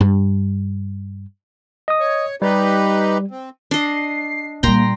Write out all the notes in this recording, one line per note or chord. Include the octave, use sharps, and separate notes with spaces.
G2
D#5 D#6
C#5
G3 D#4 G4 B4
C4
D4 D#5 C7
A#2 G3 A#3 G5 A#5 C6